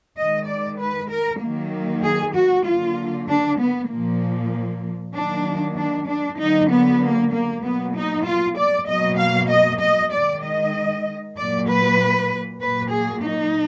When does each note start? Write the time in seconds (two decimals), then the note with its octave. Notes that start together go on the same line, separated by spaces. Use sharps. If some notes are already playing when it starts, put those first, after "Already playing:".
0.17 D#3 G#3 D#5
0.47 D5
0.80 B4
1.10 A#4
1.41 D#3 F#3 A#3
2.03 G#4
2.35 F#4
2.66 D3 F#3 A#3 F4
3.28 D4
3.59 B3
3.90 A#2 F3 A#3
5.14 D#3 F#3 A#3 D4
5.76 D4
6.08 D4
6.39 D3 F#3 A#3 D#4
6.70 B3
7.01 A#3
7.32 A#3
7.63 B2 F#3 A#3 B3
7.95 D#4
8.25 F4
8.57 D5
8.88 B2 F#3 A#3 D#5
9.19 F5
9.50 D#5
9.80 D#5
10.12 D#3 G#3 D5
10.43 D#5
11.36 A#2 F#3 A#3 D5
11.68 B4
12.61 A#2 F#3 A#3 B4
12.92 G#4
13.23 D#4